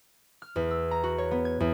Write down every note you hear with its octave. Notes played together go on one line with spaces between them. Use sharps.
F6
E2
E6
A#5
F#4
C#5
B3
G#6
E2